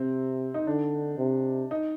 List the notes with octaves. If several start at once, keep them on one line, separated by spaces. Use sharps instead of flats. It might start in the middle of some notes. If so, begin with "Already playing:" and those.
Already playing: C3 C4
D#4
D3 D4
C3
D#4